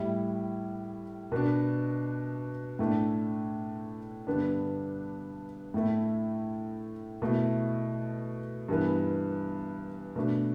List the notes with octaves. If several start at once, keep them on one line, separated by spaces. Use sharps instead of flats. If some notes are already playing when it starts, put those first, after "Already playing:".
Already playing: A2 G3 E4
B2 B3 D4
A2 A3 D4
G2 D3 B3 D4
A2 A3 E4
B2 A3 E4
G2 E3 B3
B2 A3 D4